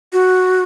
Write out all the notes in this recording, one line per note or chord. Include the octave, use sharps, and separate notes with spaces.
F#4